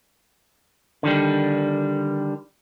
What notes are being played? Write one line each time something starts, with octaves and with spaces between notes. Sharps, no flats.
D3 D#3 G3